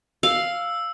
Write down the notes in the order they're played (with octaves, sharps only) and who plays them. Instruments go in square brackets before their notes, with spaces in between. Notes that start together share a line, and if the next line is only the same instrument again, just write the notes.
[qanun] F5 [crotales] E6